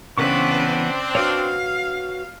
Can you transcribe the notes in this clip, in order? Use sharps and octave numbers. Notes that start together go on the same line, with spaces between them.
C#3 E3 B3 C4 D4 B4 C#6
F#4 B4 C#5 F5